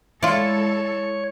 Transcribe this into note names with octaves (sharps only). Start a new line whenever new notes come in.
G#3 E4 F4 A4 C#5 D5